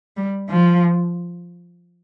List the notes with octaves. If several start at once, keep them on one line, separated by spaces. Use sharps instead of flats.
G3
F3